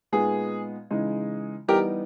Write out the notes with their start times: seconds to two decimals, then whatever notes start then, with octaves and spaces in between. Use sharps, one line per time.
0.12 A#2 G#3 B3 D#4 G#4
0.91 C#3 E3 G#3 D#4
1.68 E3 G3 B3 D#4 G4 A#4